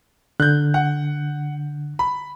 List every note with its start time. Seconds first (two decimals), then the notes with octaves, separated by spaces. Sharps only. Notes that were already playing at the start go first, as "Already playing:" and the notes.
0.40 D3 F#6 G6
0.74 F#5
1.99 B5